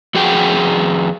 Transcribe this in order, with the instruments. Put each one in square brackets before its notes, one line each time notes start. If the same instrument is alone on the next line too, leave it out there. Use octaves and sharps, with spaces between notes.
[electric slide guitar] F2 F#4 G#4 G5